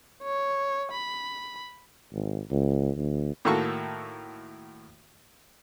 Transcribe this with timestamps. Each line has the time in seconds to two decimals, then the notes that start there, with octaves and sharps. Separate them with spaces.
0.23 C#5
0.92 B5
2.13 G#1
2.51 C#2
2.96 D2
3.45 A2 D#3 A#3 F#4 A4 C#6